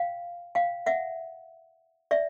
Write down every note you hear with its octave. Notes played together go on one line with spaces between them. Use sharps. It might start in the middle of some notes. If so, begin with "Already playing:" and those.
Already playing: F5 G5
F5 G5
E5 F#5
D5 E5